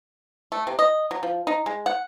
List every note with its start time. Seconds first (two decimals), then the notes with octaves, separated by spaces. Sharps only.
0.52 A3
0.67 C3
0.79 D#5
1.11 F#3
1.23 F3
1.47 D#4
1.66 G#3
1.86 F#5